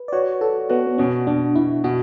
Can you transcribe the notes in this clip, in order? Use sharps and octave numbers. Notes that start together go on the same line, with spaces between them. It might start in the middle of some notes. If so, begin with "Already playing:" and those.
Already playing: B4
D5
F#4 C#5
F#4 A4
B3 F#4
B3
B2 C#4
B2 D4
B2 E4
B2 F#4